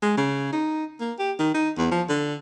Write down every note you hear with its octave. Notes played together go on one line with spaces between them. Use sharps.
G#3
C#3
D#4
A#3
G4
D#3
D#4
E2
F3
D3